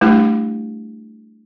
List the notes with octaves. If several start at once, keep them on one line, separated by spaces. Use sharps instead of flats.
G3 A3 D4 E4 G4